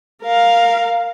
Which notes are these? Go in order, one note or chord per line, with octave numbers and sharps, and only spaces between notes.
A#4 F5